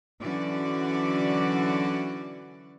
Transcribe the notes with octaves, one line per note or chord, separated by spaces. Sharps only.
D3 E3 F#3 C#4 F#4 D5